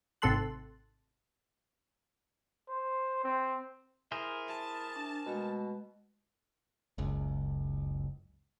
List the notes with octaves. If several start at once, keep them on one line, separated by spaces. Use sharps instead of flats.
G#1 C3 A3 A5 C6 F#6
C5
C4
E4 G#4 A#4 C5
E5 A5
D4
B2 G#3 A3
F#1 C#2